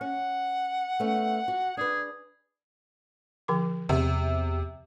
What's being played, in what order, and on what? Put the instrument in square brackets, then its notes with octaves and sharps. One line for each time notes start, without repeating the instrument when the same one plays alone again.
[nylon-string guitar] C#4 [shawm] F#5
[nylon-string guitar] A3 B3 C#4
F#4
[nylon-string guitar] D4 B4 [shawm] G#4
[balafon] D3 F3 D6
[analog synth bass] E2 [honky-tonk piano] C3